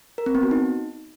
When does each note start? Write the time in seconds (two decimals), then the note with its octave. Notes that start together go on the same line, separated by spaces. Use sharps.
0.18 A#4
0.26 C4
0.35 B3
0.43 F#4
0.51 D#4